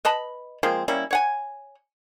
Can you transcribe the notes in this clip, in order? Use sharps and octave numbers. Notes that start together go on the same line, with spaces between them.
B4 D#5 A5 B5
F3 G#3 A#3 C4
G3 A#3 C#4 E4
C#5 F#5 G#5